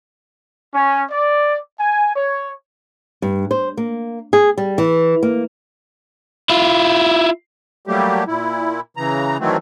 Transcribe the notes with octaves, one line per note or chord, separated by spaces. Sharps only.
C#4
D5
G#5
C#5
G2
C5
A#3
G#4
G3
E3
A#3
E4 F4
F#3 G3 A3 A#3 G4
A#2 E4
C#3 E3 A#5
D#3 E3 F#3 A3 C4